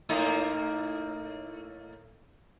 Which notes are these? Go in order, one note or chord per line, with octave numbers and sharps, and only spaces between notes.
A2 A#3 D#4